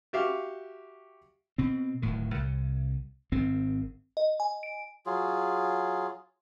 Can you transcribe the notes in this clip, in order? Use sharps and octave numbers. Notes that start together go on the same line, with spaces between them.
F#4 G4 E5 F5
B2 C4
D1 D2 A2 D#3
C2
G#1 D#3 C4
D#5
G#5
D7
F#3 F4 G#4